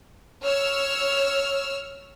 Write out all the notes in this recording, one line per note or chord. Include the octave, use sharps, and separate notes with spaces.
C#5 E6 F6